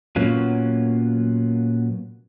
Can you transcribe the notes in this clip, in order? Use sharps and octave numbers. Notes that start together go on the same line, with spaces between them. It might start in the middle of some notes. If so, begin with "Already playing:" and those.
A#2 F#3 A#3 B3 C#4 F4